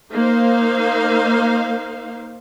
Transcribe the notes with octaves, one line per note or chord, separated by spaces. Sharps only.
A#3 D#4 C5 F5